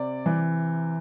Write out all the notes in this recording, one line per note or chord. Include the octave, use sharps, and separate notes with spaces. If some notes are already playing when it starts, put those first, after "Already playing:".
Already playing: C3 D5
E3